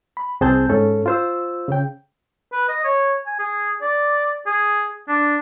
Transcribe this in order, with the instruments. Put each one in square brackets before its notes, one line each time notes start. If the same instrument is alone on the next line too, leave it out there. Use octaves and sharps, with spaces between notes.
[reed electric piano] B5
C2 C4 G#4 C5 A5 G6
G#2 C#4 A4
F4 C5 E6
C#3 G5
[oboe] B4
D#5
C#5
G#5
G#4
D5
G#4
D4